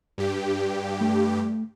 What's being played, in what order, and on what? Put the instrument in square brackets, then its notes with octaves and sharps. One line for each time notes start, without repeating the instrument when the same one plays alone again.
[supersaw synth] G2 G4
[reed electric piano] A3